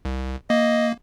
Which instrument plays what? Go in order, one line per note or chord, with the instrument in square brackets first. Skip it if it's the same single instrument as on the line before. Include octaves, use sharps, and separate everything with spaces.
[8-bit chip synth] C2
[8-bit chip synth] A#3 [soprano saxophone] D#5